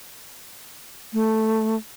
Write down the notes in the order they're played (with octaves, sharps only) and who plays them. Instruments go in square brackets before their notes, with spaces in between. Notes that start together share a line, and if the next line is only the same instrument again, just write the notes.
[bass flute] A3